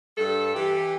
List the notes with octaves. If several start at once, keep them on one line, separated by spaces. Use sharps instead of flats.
G2 A4
E3 G4